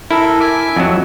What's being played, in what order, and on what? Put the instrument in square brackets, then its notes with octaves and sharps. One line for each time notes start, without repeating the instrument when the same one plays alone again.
[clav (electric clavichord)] E4 [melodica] A4 A#4
[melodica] E5 G#5 D6
[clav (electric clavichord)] F2 F#3